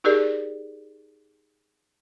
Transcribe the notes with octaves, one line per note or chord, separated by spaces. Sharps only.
D#4 G4 G#4 A#4 D5